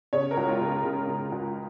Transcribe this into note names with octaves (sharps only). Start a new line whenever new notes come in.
C#3 C#5
A#4
C#2
F4
C#3
A#4
C#3
C#3
C#2